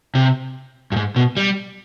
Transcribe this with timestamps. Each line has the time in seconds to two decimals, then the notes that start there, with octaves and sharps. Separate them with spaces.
0.15 C3
0.92 G2
0.96 G#2
1.16 B2
1.37 G3